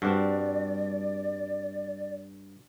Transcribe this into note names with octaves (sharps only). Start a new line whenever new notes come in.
G2 C4 D4 F#4 D5